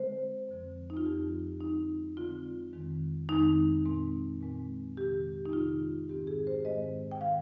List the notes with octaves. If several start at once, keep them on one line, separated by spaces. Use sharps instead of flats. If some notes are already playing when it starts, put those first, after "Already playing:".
Already playing: D3 G#3 C4 C5
F2 D3 F3 C4
D#4
F4
F2 D3 F3 C4 G4
D3 G#3 C4 D#4
D3 G#3 C4 F4
F2 D#3 G#3 C4
F2 D#3 G#3 C4 D#4
A#2 G#3 C4
A#2 G#3 C4
F2 C3 D#3 G#3 G4
D#4
F2 C3 D#3 G#3 F4
G#2 D#3 G#3 C4 G4
G#4
C5
G#2 D#3 G#3 C4 D#5
G5
D#3 G#3 F5